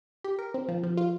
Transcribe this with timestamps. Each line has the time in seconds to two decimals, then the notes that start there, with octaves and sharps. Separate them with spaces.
0.24 G4
0.39 A#4
0.54 C4
0.69 F3
0.83 F3
0.97 F4